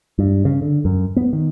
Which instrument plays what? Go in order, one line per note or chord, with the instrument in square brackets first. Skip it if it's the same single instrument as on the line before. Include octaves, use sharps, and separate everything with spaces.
[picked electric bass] G2
C#3
D3
F#2
B3
D#3